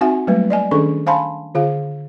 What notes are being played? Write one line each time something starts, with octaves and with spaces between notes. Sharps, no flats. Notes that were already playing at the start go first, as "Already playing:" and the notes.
C4 D#4 F#4 E5 F#5 G#5
F#3 G3 A3 A#3 B4
D5 D#5 G#5
D#3 C#4 D4 G#4 A4 C#6
C5 F5 G#5 A5 B5 C6
D3 F4 G#4 F5